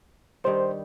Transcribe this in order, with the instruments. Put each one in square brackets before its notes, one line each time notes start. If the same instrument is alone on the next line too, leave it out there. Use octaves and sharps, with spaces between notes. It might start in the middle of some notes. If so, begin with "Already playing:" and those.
[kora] G2 D#3 G3 [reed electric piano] C5